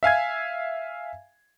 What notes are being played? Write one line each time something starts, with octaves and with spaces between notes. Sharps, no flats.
E5 F5 G#5 G#6